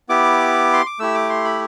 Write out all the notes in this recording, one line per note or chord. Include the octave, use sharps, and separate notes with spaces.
B3 E4 G4 D6
C6
D6
A3 E4 G4 E6
D6
C6
B5